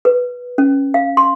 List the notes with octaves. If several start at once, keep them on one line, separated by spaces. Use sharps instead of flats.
B4
C#4
F5
C6